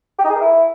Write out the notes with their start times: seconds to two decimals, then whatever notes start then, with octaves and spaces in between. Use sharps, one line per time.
0.19 G4
0.24 D#4
0.30 G#4
0.35 A#4
0.41 E4